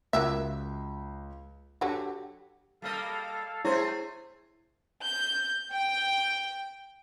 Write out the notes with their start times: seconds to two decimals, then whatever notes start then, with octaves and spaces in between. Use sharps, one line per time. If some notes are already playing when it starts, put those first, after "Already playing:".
0.13 C#2 A#3 F#4 E5
1.81 D3 F#3 F#4 G4
2.82 G3 A#3 A4 D#5 F5
3.65 A3 E4 G#4 C5 C#5
5.03 G6
5.73 G5